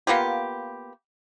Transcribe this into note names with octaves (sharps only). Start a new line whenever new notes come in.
A#3 B3 F4 G4